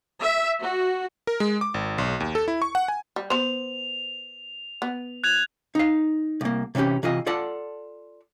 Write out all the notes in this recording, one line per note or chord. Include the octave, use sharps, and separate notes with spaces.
E5
F#4
A#4
G#3
D6
G#1
B1
D#2
A4
E4
C#6
F#5
G#5
G3
B3 C5 F7
B3
F#6 G#6 F7
D#4 F5
C2 A#3
C3 E3 C4 C#4 G4
C3 E3 F4 D#5
F4 A4 D5 F#5 A5